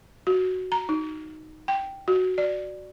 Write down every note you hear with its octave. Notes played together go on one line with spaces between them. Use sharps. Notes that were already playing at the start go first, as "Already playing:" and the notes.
F#4
A#5
D#4
G5
F#4
D5